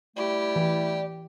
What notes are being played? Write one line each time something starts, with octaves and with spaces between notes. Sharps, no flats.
G3 A3 E4 G4 D5
E3